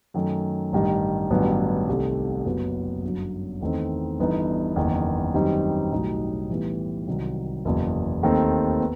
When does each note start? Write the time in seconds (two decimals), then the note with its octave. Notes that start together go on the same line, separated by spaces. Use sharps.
0.14 F#2 D#3 A3
0.73 A1 G2 D#3 G3
1.30 A1 G2 D#3 F#3 B3
1.88 C2 C3 D#3 A3
2.45 F#1 F#2 F#3 B3
3.03 G1 F#2 F#3
3.61 E2 D#3 A3 C4 D#4
4.19 G1 G2 E3 B3 D#4
4.76 F#1 E2 D#3
5.34 F#2 D#3 G3 C4 D#4
5.92 B1 A2 G3 D#4 F#4
6.49 A2 E3 G3 B3
7.07 C2 C3 D#3 F#3
7.65 F#1 E2 B2
8.23 D#2 D#3 A3 C4
8.80 B3